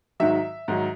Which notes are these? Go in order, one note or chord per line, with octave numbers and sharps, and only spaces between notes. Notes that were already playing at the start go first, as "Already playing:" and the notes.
G#2 D#3 F#3 E5
G#2 D#3 F#3